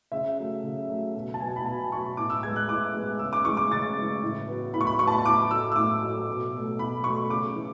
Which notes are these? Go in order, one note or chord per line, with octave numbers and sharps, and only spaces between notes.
C#3 E5
F#3 A3
C#3
F#3 A3
B2
A5
F#3 B3 G#5
B5
B2 A5
F#3 B3 C#6
A2 D6
E6
G#3 B3 G#6
F#6
A2 D6
G#3 B3
C#3 E6
D6
E3 G#3 C#6
D6
C#3 A6
E3 G#3
A2
F#3 B3
A2 B5
C#6
B5
F#3 C#6
B3 A5
B5
A2 D6
F#3 A3 E6
E6
A2 D6
F#3 A3
B2
F#3 A3
B2 B5
F#3 A3 C#6
C#3 D6
E3